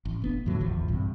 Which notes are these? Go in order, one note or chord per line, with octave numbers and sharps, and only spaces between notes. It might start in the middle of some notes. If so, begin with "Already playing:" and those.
A1
F1 B3 D4
E2 A2 D3 F#3
D1 G#1 E2 F3
A#1 G2 C3